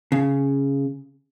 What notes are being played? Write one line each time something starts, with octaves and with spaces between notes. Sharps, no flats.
C#3